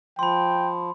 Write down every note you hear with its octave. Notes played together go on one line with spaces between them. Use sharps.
F3 G5 B5 C6